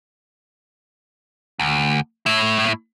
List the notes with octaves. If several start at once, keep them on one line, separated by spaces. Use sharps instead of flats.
D2
A2 E4